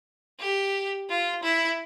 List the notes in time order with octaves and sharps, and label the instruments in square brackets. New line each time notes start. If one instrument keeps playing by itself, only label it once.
[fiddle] G4
F4
E4